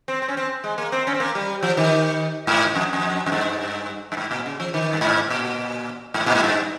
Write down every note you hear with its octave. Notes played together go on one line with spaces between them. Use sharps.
C4
C4
C#4
C4
G#3
A#3
C4
C#4
C4
A#3
G3
F3
D#3
G#2
F2
F2
F2
G2
G2
G#2
A#2
C#3
F3
D#3
G2
G#2
A#2
G#2
A#2
G#2
G2